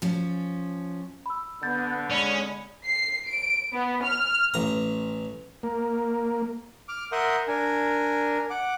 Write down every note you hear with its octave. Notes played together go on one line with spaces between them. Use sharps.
F3 C#4
B5 E6
D3 B3 G6 A6
G#3 C#4 D5 B5
C7
D7
B3
F6
A1 A#5
A#3
D6 F6
A#4 E5 F#5 C6 D#6 G6
D4 A#4 G#5
F#5 D6